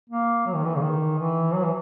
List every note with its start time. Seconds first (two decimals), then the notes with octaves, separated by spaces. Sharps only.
0.10 A#3
0.46 F#3
0.55 D#3
0.64 E3
0.76 C#3
0.82 D#3
1.19 E3
1.55 F#3
1.65 E3